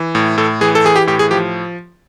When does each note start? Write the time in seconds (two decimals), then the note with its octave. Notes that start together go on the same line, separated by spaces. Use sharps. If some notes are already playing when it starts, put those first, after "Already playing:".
Already playing: E3
0.15 A2
0.38 A2 A4
0.61 E3 G#4
0.75 A4
0.84 E3 G#4
0.96 G4
1.07 A2 G4
1.19 G#4
1.31 F3 G4